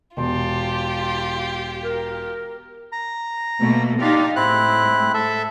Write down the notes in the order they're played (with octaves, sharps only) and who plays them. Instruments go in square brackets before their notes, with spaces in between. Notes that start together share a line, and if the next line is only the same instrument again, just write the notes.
[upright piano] E1 [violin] F4 G4 [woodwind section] G5 A5 C6
[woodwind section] A#4
[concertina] A#5
[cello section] B2 A3 A#3
[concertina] D4 F4 D5 [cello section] D#4 G4 F5
[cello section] A2 G#3 [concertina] C4 E4 F#6
[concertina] A4 E5